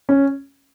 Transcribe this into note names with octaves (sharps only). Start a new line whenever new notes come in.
C#4